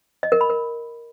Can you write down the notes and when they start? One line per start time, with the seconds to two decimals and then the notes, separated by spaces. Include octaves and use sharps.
0.23 D#5
0.32 A#4
0.41 B5
0.50 A#4